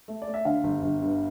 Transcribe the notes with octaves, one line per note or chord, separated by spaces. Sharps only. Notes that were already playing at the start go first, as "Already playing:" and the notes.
A3
D5
A3
E5
D3 F5
G1
G1
G2